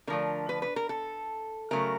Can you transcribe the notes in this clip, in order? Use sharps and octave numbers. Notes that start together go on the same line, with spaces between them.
D3 F3 A3 A#4
B4
B4
A#4
A4
C#3 F#3 A3 A#4